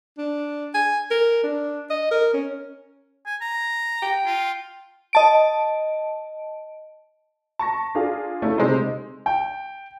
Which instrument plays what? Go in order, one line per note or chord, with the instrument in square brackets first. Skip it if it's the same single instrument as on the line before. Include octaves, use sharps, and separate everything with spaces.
[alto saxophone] D4
G#5
A#4
D4
D#5
A#4
C#4
[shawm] G#5
A#5
[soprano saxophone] G5
[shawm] F4
[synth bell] D#5 A5 D7
[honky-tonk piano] A5 C#6 A#6
D4 F4 G#4 F5
A3 C#4 D#4 E4
C3 G#3 D#4 C5
[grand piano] G5